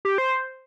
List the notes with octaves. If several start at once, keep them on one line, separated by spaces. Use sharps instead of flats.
G4
C5